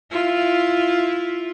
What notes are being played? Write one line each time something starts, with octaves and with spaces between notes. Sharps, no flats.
E4 F4